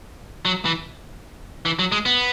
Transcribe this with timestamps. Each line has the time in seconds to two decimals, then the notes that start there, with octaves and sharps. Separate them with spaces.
0.45 F#3
0.65 E3
1.65 E3
1.79 F#3
1.92 G#3
2.06 B3